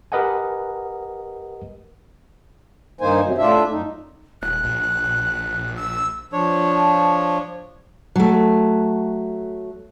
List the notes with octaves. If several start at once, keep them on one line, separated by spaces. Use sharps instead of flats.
G4 A#4 B4 D#5 F#5 G#5
G2 D#3 A#3 D#4 C5 G#5
F#2 C3 F#3
A2 D4 F4 E5
F#2 D#4
D#1 F#6
A#1
E6
F3 D4 C#5
F#3 A3